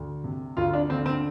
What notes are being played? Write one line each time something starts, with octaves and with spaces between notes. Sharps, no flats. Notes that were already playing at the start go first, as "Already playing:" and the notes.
Already playing: D2
C3
D2 F4
D4
D3 C4
C4